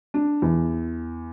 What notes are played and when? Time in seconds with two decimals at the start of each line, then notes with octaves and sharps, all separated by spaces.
0.14 D4
0.42 E2